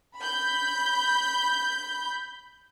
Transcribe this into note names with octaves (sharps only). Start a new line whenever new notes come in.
B5 G6